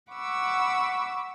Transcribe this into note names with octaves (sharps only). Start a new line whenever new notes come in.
F#5 B5 C#6 D6 E6